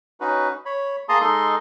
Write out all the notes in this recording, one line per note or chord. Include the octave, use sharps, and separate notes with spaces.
C#4 D#4 F#4 B4
C#5 B5
A#3 G#4 A5 A#5 C6 D#6
G#3 D#4 A4 D#5 C6